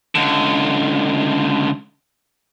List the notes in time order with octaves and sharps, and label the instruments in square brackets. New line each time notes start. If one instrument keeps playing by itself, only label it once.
[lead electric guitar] C#2 D3